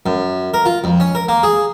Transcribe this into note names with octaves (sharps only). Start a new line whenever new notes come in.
F#2
A#4
F4
F2
C#4
A#4
A#3
G#4